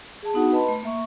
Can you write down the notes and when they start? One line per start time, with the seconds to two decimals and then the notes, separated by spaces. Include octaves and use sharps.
0.23 G#4 A5
0.34 B3 D4 D#4 F#4 F#5
0.52 B4 D#5 A5 B5 C6
0.68 A3
0.83 A#3 E5 C#6